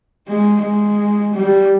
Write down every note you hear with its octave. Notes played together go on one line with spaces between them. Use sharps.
G#3
G#3
G3